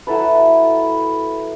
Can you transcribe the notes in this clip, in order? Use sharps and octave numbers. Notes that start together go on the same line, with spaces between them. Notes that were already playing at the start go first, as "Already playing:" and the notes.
F#3 E4 A4 B4